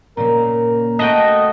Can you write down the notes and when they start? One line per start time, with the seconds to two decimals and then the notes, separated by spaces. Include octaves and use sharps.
0.17 A#2 C#3 A#3 A#4
0.99 A3 F#4 D#5 G5